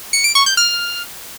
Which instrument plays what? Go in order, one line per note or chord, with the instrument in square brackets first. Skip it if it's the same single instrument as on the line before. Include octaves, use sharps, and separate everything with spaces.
[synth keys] C#7
D7
C#6
G6
F6